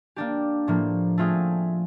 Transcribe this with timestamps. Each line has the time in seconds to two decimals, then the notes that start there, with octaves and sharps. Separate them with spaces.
0.16 A#3 D4 G4
0.67 A2 F3 A#3
1.18 A3 C4 F4 G#4